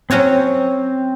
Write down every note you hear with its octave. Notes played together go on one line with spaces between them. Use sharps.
F#3 C4 C#4 F#4 C#5